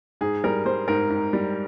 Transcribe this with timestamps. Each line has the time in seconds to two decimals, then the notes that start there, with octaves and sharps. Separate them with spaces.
0.21 G#2 G#4
0.44 G3 A#4
0.65 G3 C5
0.88 G#2 A#4
1.10 G#2
1.33 G3